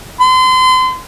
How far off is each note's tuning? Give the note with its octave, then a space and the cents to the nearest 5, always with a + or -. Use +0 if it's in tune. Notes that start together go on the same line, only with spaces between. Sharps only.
C6 -35